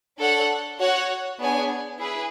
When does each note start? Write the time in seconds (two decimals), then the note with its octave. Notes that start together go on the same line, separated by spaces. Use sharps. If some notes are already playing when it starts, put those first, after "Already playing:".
0.18 D4 A4 C#5 F#5
0.79 F#4 C#5 F#5
1.39 B3 D4 G#4 C#5 G#5
1.98 E4 G#4 B4